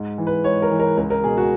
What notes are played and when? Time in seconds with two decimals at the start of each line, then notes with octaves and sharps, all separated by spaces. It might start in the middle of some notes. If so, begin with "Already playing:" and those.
Already playing: G#2
0.18 E3
0.27 B4
0.44 G#2 C#5
0.62 A#4
0.71 E3
0.79 A#4
0.97 C#2 A#4
1.10 A#4
1.24 B2 G#4
1.37 F#4